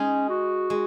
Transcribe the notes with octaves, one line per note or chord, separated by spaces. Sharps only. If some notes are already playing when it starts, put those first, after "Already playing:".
Already playing: G#3 C#4 D#4 G#4
F#4
G#3